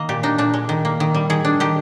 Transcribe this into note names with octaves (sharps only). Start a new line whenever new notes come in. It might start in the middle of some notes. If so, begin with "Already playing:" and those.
Already playing: D#3 A#3 D#5
A#2 G4
D4 D#4
A#2 D4
G#3
D#3
A#3
D#3
G3
D#3 G#4
D4
D#3 G4